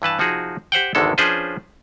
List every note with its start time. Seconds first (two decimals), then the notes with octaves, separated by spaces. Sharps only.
0.02 G2 E3 B4 A5
0.19 C3 F3 D#4 F#4 G#4
0.72 G4 C5 F#5 G5
0.95 G#1 E2 D3 D#3 G#3 A4
1.18 F3 C#4 D4 G#4 B4 C5